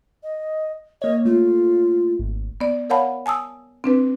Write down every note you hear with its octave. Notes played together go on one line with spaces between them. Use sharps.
D#5
A#3 C#5 D#5
A3 F4
G#1
B3 D5
A#4 C#5 F5 F#5 A5 B5
G#5 A5 D#6 E6
C4 D4 B4